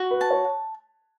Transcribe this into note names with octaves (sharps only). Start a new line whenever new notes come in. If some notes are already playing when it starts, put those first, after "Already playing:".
Already playing: F#4
B4
A5
C#5